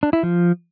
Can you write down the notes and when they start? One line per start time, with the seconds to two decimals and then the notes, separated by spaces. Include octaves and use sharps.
0.03 D4
0.13 E4
0.23 F3